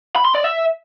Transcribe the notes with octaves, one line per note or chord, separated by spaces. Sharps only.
B5
C6
D5
E5